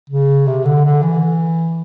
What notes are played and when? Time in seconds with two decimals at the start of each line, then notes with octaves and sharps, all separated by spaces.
0.09 C#3
0.47 C3
0.65 D3
0.84 D3
1.02 E3